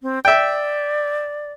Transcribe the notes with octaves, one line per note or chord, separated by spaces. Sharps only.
C4
D5 E5 G5